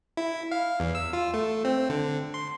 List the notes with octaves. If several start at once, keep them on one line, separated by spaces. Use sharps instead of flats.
E4
F5
E2
E6
F4
A3
C4
D3
C6